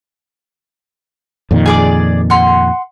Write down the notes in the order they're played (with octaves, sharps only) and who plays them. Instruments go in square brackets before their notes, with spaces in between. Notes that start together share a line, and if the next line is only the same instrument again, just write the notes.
[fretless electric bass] F2 A#2 D#3
[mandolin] G#4 D5 D6
F#5 C6